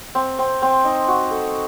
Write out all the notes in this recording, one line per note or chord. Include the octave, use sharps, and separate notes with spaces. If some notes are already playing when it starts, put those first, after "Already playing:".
C4
C4
C4
D#4
F#4
A4